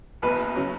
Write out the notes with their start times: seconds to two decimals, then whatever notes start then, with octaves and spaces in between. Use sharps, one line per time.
0.22 F#1 E2 B2 B4
0.55 C#3 F#3 C#4